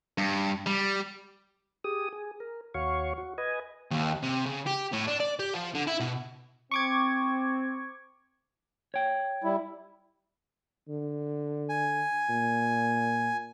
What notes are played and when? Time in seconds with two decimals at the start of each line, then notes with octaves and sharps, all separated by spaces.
0.18 G2
0.66 G3
1.84 G4 G#4 D#6
2.13 G#4
2.40 A#4
2.74 D#2 F#4 C#5 F5 C#6
3.18 F#4
3.38 B4 D#5 G#5
3.91 D#2
4.23 C3
4.46 C#3
4.67 G4
4.93 A2
5.07 D4
5.20 D5
5.39 G4
5.54 F3
5.75 D3
5.87 E4
6.00 B2
6.71 C4 C#6 D6 G#6
8.94 C#5 G5
9.44 G3 E4
10.89 D3
11.69 G#5
12.29 A#2